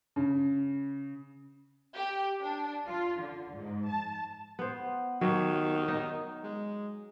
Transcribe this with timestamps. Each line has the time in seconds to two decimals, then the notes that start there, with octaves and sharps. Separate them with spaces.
0.16 C#3
1.95 G4
2.41 D4
2.88 F4
3.21 D3
3.54 G#2
3.91 A5
4.59 B3 C5
5.21 D#3 F#3
5.88 D#4
6.43 G#3